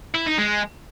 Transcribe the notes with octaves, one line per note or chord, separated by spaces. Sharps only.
E4
D#4
G#3